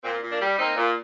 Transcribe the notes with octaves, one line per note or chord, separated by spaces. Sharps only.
A#2 C4
A#2
A#3 D4
G3
A#3 C4 D#4
A#2